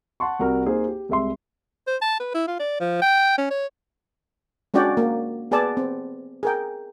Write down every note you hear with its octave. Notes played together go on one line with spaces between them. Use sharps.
F#5 A5 C6 C#6
C2 F#4 A#4
A#3 D#4 G#4 C5
G4
C2 G#3 E5 C6
C5
A5
B4
E4
F4
D5
F3
G5
C#4
C#5
G#3 C#4 D4 F#4 D5 G5
A#3
B3 G#4 B4 D5 A5
C4
G#4 A#4 G5